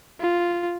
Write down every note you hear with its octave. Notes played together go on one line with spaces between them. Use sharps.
F4